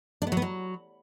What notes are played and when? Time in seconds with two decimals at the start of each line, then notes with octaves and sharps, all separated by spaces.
0.22 D4
0.27 B3
0.32 F#3
0.37 B3
0.42 F#3